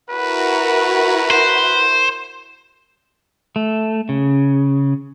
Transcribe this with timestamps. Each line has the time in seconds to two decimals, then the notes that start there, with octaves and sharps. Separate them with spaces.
0.10 E4 F#4 A#4 B4
1.31 C5
3.56 A3
4.09 C#3